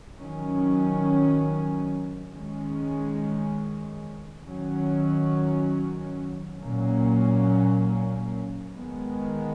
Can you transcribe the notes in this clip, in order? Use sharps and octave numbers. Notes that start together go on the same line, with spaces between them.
D#3 F#3 C#4
D#3 G#3 C#4
D#3 F#3 C#4
A#2 F#3 A#3 C#4
D#3 G#3 B3